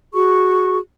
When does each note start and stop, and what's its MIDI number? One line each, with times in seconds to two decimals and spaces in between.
0.13 0.78 66
0.13 0.78 68
0.13 0.78 85